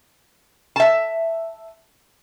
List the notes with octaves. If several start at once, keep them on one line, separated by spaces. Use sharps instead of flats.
E5 A5